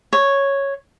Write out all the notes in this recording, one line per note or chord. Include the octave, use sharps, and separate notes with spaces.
C#5